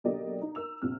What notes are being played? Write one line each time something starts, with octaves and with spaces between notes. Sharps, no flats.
B1 D3 A#3 G4 D5 D#5
D#4
A#4 E6 F7
A#1 C3 F6